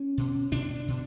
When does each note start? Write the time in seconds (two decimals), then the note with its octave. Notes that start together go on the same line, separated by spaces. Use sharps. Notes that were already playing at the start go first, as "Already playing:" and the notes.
Already playing: C#4
0.18 B2
0.52 B2 D4
0.88 B2